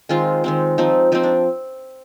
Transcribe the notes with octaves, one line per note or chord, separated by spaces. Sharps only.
D#3 G#3 C4 F4
D#3 G#3 C4
F3 C4 D#4
F3 C4 D#4
D4